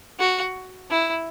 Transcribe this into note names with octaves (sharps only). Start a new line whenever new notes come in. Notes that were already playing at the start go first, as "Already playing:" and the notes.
F#4
E4